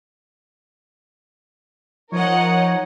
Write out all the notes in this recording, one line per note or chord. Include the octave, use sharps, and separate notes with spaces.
F3 D#4 A#4 C#5 D#5 F#5